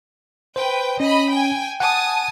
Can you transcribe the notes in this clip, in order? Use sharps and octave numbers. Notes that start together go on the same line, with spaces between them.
B4 C5 G5
C#4 D#5 B5
G5 G#5
F#5 G#5 A5 D#6